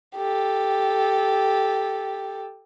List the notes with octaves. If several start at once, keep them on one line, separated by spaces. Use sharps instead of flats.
G4 A4